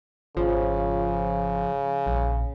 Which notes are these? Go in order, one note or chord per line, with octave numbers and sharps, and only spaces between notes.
G#1 C#3 F3
A#1